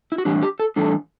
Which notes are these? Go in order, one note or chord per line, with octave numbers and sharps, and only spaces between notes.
E4
F#4
A2 E3 G3 D4 G4
G4
A4
A2 E3 G3 D4 A4